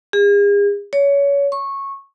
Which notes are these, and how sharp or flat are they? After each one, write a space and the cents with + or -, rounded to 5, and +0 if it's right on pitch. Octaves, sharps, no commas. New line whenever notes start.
G#4 -40
C#5 +25
C#6 -15